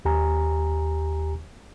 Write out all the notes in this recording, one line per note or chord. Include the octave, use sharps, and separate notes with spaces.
D#2 G4 G#5 A#5